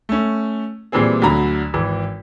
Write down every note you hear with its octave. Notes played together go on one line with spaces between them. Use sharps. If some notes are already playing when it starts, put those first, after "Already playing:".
A3 C#4
A#2 E3 G3 C4 G#4
D2 D3 F#3 A#5 B5
G#1 E3